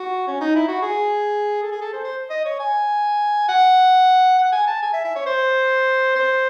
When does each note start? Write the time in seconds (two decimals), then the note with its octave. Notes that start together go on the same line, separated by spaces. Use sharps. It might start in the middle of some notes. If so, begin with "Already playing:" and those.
Already playing: F#4
0.27 C#4
0.41 D#4
0.56 E4
0.68 F#4
0.82 G#4
1.62 A4
1.71 G#4
1.82 A4
1.93 C5
2.04 C5
2.30 D#5
2.45 C#5
2.60 G#5
3.48 F#5
4.39 F#5
4.52 G#5
4.67 A5
4.83 G#5
4.93 E5
5.05 E5
5.16 C#5
5.26 C5
6.16 C5